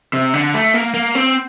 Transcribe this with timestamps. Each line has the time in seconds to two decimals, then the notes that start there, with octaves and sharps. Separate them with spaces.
0.13 C3
0.34 D3
0.54 A3
0.74 A#3
0.94 A#3
1.15 C4